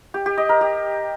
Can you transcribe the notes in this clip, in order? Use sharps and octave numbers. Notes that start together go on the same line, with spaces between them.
G4
G4
D#5
A#4
G4